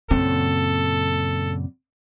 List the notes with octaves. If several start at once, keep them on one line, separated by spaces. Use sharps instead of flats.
F#2 A#2 C#3 C4 A4